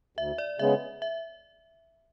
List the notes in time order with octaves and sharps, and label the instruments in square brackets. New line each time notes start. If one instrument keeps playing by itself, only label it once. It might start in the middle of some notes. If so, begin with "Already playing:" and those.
[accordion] D2 [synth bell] E5
[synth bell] D5
[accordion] C#3 G#3 B3 [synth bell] E5
[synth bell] E5